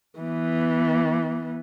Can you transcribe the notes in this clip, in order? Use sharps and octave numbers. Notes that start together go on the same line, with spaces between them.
E3 B3